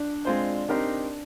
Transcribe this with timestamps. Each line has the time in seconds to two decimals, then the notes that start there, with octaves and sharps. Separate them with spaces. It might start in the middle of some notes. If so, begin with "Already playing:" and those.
Already playing: D4
0.25 G#3 C4 F4 C5
0.69 C4 D4 D#4 G4 A#4 D5